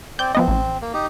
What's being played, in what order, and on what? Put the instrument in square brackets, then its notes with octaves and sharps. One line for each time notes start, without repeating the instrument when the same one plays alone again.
[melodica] C4 D5 [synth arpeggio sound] G6
[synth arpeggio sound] F3 B3 D#5 [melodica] C4
[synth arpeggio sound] A1
[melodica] A#3
D#4 G4